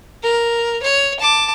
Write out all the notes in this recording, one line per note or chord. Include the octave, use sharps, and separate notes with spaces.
A#4
C#5
A5 D6